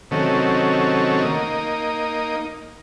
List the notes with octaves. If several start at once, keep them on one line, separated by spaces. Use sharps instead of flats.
C3 D#3 F#3 A3 C#4
A#3 D#4